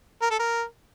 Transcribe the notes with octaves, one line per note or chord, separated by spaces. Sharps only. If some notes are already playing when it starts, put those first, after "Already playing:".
A#4
A4
A#4